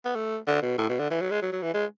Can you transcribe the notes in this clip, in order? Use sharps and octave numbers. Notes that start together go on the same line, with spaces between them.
B3
A3
D3
B2
A2
B2
D3
E3
F#3
G#3
F#3
F#3
E3
G#3